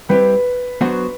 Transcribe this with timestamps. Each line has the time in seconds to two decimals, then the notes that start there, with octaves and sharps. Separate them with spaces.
0.09 G3 C4 E4 G4 B4
0.81 F#3 B3 D4 F#4 C5